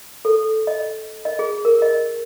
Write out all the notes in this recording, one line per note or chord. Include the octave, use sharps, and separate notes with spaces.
A4
D#5
D#5
G#4
A#4
D#5